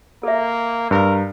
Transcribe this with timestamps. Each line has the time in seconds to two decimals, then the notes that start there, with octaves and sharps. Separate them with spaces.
0.23 A#3 A4 E5
0.91 G2 A#4